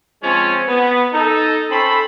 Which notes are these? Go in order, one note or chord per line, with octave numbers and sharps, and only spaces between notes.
F3 G#3 C4 C#4
B3
D#4 A4 D#5
C4 C#4 A4 B5